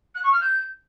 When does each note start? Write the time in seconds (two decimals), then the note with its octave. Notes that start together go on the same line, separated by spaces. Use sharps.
0.15 F#6
0.24 C#6
0.32 F6
0.41 G6